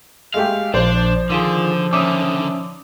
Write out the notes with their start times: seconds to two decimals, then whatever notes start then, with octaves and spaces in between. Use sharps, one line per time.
0.34 G#3 A3 G4 F5
0.74 A#1 F3 D4 C5 D5
1.30 D3 D#3 F4 G#4
1.93 D3 D#3 C#4 E5 D6 D#6